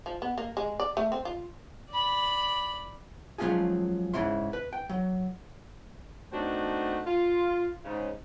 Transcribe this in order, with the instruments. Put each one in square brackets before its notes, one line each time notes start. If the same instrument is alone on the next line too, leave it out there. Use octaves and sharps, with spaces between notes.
[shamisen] F3
B3
A#3
G#3
D5
A3
C4
F4
[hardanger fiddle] D5 B5
[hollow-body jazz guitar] F3 F#3 G#3 C#4 F4 G#4
G#2 C#3 E4 C6
B4
G5
F#3
[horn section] A3 B3 C4 D4 D#4 F#4
F4
G#2 C#3